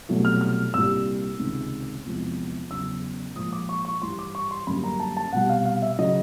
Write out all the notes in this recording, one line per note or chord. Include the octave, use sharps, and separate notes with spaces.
C2 B2 F#3 A3
F6
F6
C2 A#2 G3 E6
C#2 C3 D#3
E2 C3 F3 G#3
E2 C#3 F#3 E6
A#2 F3 G#3 D#6
D6
C#6
C#6
G2 E3 G3 C6
D6
C#6
C6
F#2 D3 G3 A#3 B5
A#5
A5
A5
C2 B2 G3 F#5
F5
F5
E5
C#3 F#3 D#5